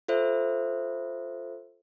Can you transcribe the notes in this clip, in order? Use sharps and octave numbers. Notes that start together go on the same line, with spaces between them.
F4 A4 C5 E5